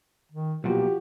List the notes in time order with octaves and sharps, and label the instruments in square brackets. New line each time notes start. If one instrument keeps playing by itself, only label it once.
[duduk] D#3
[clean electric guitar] B1 A#2 [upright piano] F3 F#4 [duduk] G4